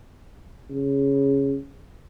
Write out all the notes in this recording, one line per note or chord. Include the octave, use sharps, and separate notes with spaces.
C#3